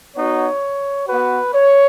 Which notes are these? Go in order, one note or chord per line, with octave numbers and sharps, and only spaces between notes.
B3 D#4 F#4 C#5
B3 F#4 B4
C#5